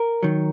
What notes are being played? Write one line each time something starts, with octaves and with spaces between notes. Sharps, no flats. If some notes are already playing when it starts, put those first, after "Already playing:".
Already playing: A#4
D#3 F#3